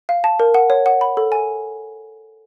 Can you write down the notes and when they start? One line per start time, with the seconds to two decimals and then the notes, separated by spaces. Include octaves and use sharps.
0.09 F5
0.24 A5
0.40 A#4
0.54 F#5
0.70 C#5
0.86 F#5
1.01 B5
1.17 A4
1.32 G#5